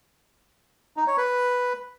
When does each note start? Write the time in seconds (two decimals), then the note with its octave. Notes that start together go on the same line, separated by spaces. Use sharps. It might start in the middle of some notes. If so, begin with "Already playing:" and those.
0.97 D#4
1.07 C#5
1.17 B4